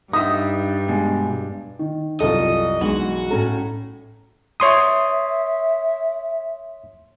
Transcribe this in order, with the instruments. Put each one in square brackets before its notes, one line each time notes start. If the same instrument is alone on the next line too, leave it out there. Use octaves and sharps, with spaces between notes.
[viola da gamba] G2 [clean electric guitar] D#4 E5 [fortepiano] D#6
[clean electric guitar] B2 G#3
[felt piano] D#3
[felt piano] C2 F#2 [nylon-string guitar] F4 A4 [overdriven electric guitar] D#5
[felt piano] B1 [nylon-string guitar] E3 G#3 D4 [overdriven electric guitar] F#4
[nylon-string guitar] A2 C#4 A4 [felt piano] A#5
[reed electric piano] C#5 C6 D#6 [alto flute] E5